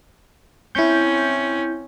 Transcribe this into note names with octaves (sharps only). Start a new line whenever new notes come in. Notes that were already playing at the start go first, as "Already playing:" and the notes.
C4 C#4 E4 G6